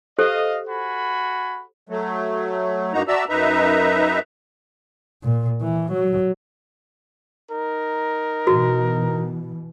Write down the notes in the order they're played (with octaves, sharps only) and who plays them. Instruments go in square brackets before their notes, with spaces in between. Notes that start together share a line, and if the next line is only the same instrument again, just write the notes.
[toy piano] G4 A4 C5 [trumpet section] D#5 F5
[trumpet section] F#4 G#5 B5
[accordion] F#3 A3
G2 A#3 D#4 F#4 A#5
F#4 D5 E5 A5 A#5 E6
F#2 D#4 B4 E5 A#5
[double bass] A#2
E3
F#3
[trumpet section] D#4 A#4
[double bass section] B2 E3 [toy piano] F#4